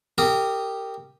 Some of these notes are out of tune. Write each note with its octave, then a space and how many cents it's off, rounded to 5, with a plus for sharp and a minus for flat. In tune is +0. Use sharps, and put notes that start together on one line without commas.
G4 +0 A#4 -25 D#6 +0